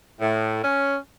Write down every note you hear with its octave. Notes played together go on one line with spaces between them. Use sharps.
A2
C#4